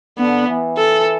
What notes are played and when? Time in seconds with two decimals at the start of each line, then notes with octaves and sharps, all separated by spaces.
0.18 D3 B3
0.48 E3
0.77 A4